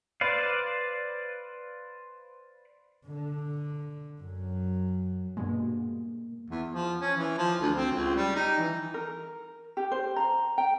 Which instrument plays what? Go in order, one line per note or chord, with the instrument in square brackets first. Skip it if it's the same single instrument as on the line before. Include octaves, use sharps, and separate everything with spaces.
[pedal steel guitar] B4 C5 D5 F5
[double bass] D3
F#2 F#3
[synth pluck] G2 B2 G#3 [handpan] A#3
[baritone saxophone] E2
F3
C#4
E3
F3
D2
C4
C#2
G3
D#4
E3
[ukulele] A#4
G4
C5
A#5
G5